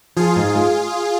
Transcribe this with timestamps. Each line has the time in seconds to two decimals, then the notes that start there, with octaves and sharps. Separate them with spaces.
0.16 F3 F4 G#4
0.36 G#2
0.55 G#3